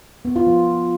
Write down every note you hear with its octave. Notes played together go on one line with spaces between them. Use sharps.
B3
F4
F3